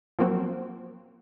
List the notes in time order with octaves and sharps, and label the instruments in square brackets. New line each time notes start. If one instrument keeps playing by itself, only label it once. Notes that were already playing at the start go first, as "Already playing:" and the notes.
[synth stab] F3 F#3 A#3 C4 F#4